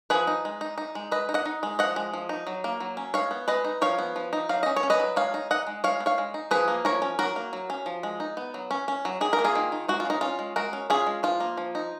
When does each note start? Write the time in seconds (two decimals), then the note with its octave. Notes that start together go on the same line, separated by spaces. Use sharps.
0.10 F3 G#4 B4
0.27 D#4
0.45 G#3
0.61 D#4
0.78 D#4
0.95 G#3
1.11 G#3 B4 D#5
1.29 D#4
1.34 D#5 F#5
1.46 D#4
1.63 G#3
1.79 F3 D#5 F#5
1.96 G#3
2.14 F3
2.29 D#4
2.47 F#3
2.64 A#3
2.80 F#3
2.97 C#4
3.14 G#3 C#5 F5
3.31 B3
3.48 G#3 B4 D#5
3.65 D#4
3.82 F3 C#5 F5
3.99 B3
4.16 F3
4.33 D#4
4.49 F#3 F5
4.63 C#4 D#5
4.76 C#5
4.83 C#4
4.90 B4 D#5
5.00 F#3
5.16 G#3 C#5 F5
5.34 D#4
5.51 D#4 D#5 F#5
5.67 G#3
5.84 G#3 C#5 F5
6.00 B3
6.06 C#5 F5
6.18 G#3
6.34 D#4
6.51 F3 G#4 B4
6.68 A#3
6.85 F3 A#4 C#5
7.02 C#4
7.19 F#3 F#4 A#4
7.36 A#3
7.53 F#3
7.70 C#4
7.86 F3
8.03 G#3
8.20 D#4
8.37 B3
8.54 F#3
8.71 C#4
8.88 C#4
9.05 F#3
9.21 D#3 G#4
9.33 A#4
9.39 A#3
9.44 F4 G#4
9.55 D#3
9.72 D#4
9.88 G#3 F#4
10.00 F4
10.05 C#4 D#4
10.21 C#4 F4
10.39 G#3
10.56 G#3 F#4 A#4
10.73 C#4
10.90 C#4 F4 G#4
11.07 G#3
11.23 F3 F4
11.40 A#3
11.57 F3
11.75 D#4